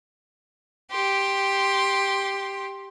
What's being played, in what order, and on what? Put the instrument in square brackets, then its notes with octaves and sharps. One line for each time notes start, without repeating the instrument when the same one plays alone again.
[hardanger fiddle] G4 C6